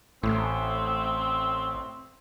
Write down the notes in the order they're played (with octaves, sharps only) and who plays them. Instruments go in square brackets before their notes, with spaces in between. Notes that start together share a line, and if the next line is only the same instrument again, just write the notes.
[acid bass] A1 [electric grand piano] A2 [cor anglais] C4